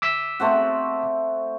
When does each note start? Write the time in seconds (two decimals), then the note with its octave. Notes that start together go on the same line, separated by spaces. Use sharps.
0.02 D6 E6 B6
0.40 A3 C4 F#4